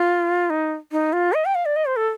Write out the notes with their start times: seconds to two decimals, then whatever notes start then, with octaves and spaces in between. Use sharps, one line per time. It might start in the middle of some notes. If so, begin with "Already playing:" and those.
Already playing: F4
0.50 D#4
0.92 D#4
1.13 F4
1.33 D#5
1.45 G5
1.55 F5
1.65 D5
1.76 D#5
1.86 C5
1.96 A4